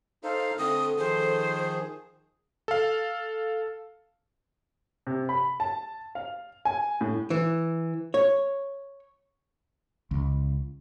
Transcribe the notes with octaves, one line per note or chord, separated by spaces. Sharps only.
D#4 A4 C5 F5
D3 A3 C4 A4 D#6
D#3 F3 G#4 C5
A4 F5
C3
B5
A5
F5
G#5
A2
E3
C#5
C#2